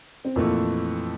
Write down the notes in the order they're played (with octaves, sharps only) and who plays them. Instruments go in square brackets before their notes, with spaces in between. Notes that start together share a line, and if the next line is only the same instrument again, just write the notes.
[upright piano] C4
[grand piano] F2 E3 A3 [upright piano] A#2 A#3